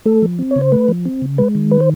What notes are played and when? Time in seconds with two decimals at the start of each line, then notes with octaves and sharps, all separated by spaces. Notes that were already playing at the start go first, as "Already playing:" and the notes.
0.06 A3 A4
0.22 F3
0.39 C4
0.51 C#5
0.56 C#3
0.61 C5
0.72 A3 B4
0.88 F3
1.06 C4
1.22 C#3
1.38 G#3 B4
1.55 D#3
1.71 B4
1.80 C5